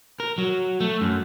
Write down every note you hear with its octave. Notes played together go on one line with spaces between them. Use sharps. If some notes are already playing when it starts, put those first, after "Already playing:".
A#4
F#3
A3
F#2